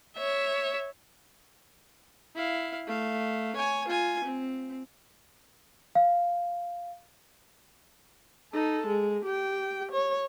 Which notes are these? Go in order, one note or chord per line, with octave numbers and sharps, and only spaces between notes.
C#5 E5
E4 F5
A3 F5
C#5 G#5
F4 G#5
C4
F5
D#4 A4
G#3
G4 G5
C#5